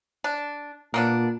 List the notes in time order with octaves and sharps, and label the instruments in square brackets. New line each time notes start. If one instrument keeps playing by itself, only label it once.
[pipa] D4
[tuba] A#2 [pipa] A#3 B3 D4